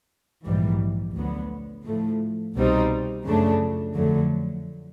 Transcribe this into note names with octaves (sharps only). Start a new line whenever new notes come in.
A#1 G#2 E3 G3
D2 D3 F#3 B3
A2 F3 A3
C2 B2 G3 C4 D#4
F#2 C#3 F3 A3 D4
F2 D3 F#3 A3